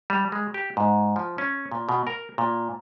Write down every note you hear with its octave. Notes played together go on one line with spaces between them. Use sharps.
G3
G#3
G4
G#2
F3
C#4
A#2
B2
A#4
A#2